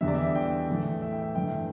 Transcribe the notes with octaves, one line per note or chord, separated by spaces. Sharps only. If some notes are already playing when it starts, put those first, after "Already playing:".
E2 D3 G3 E5
D5
E5
G5
A2 E3 A3
E5
G5
E5
G2 E3 A3 G5